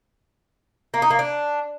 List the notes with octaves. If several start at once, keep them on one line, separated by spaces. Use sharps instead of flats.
A#3
D#4
A#3
D4